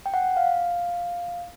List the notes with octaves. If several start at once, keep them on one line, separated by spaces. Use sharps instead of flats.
G5
F#5
F5